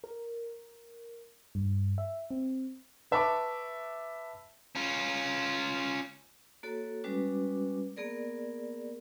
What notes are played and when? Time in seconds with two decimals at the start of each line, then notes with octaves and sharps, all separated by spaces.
0.04 A#4
1.55 G2
1.98 E5
2.31 C4
3.11 B4 E5 A5 B5 C#6 D6
4.75 C#4 F4
6.63 A#3 F#4 A4 C#5
7.04 G3 G#3 C#4 F#4 B4 D6
7.97 A#3 B3 G#4 A#4 D5